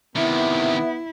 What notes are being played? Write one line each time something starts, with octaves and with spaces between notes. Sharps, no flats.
C3 D#3 B3 E4 E5